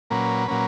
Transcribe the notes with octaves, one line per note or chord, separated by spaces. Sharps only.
A#2 F#3 A#3 C#4 B4
A#2 F#3 A#3 C#4